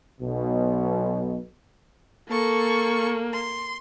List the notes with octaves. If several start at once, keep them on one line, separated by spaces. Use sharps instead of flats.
B1 B2
A#3 A4 C#6
C6